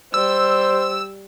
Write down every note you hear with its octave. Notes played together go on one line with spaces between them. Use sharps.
G3 C5 E6